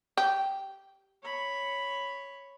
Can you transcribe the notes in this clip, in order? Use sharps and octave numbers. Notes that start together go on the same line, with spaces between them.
G4
C#5 B5